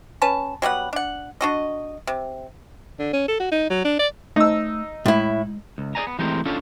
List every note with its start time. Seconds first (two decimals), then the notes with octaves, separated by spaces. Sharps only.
0.22 C#4 B4 A5
0.62 F#3 G3 B3 F#5
0.93 D4 F#5
1.41 D4 F#4 D#5
2.07 C3
2.99 D3
3.13 C#4
3.28 A4
3.40 F#4
3.52 D#4
3.70 F#3
3.85 D4
3.99 D5
4.36 A3 D#4 E6
5.06 A2 G#3 E4
5.78 C#2
5.95 G#4 C#5 D5 G#5 A#5
6.07 B3
6.19 E3 G#3 A3 C4 G4 A#4
6.45 C#4 D4 F4 A4